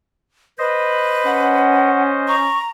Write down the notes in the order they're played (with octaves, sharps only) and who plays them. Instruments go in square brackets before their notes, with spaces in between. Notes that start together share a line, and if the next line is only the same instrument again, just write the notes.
[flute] B4 [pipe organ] C5 D#5
[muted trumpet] C#4 [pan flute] F#5
[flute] A#5 [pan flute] C#6